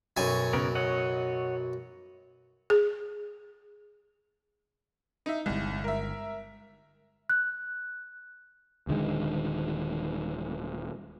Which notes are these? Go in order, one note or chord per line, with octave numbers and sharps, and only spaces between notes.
B1 F#2 G#5
C#3 B3 A#4
C#5 D#5 F#5
G#4
D#4 E5
G1 C2 G#3
A#4 E5
F#6
D#1 D3 D#3 G#3